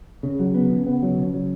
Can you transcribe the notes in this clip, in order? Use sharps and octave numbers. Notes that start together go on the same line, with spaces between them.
C#3
F#3
B3
C#3
B3
F#3
C#3
F#3